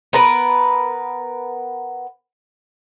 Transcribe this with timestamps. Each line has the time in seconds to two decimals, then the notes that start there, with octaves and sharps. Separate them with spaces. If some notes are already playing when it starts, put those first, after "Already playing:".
0.13 B3 A#4 B4